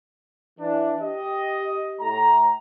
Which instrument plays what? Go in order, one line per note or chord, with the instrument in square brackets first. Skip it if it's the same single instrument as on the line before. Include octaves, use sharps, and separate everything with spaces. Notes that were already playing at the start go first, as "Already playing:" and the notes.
[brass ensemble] E3 D4
G4 D#5
A2 A#5